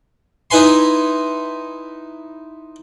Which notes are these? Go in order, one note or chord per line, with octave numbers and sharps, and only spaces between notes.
D#4 E4 B4 G#5 C6